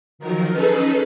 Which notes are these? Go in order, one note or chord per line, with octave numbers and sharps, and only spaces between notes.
D#3 F3 F#3 A#4
C#4 D#4 G#4 A4 B4